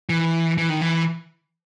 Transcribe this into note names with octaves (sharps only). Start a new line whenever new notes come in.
E3
E3
D#3
E3